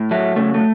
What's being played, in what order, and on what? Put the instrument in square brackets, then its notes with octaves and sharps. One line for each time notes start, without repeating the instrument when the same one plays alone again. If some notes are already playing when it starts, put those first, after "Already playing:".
Already playing: [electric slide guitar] A2
F#3 A3
C#3 A3
A3